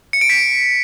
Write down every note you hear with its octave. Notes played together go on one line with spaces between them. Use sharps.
C#7
D7
B6